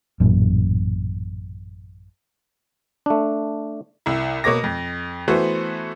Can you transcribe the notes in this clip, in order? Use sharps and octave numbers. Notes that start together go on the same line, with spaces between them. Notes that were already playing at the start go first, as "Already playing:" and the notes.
A1 F#2 A#2
A3 D4
C2 E4
B2 A#3 C#5 D6 A#6
F2
E3 A3 B3 F#4 C5